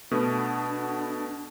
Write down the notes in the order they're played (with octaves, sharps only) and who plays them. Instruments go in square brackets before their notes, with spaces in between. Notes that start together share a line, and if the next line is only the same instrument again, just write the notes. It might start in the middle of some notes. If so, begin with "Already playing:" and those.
[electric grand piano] B2 A3 B3 [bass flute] D4